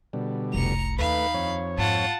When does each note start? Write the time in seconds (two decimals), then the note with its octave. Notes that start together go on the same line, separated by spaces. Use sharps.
0.13 B2 D3 G3
0.54 F1 C2 A#5 C#7 F7
0.99 D#2 A3 D#4 B4 F5 B5
1.34 F2 C#5
1.78 G#2 F4 F#5 A5